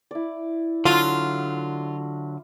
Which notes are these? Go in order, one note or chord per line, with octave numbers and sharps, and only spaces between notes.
E4 D5
D3 F#3 F4